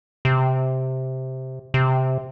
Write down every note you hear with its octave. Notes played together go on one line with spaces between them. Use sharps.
C3
C3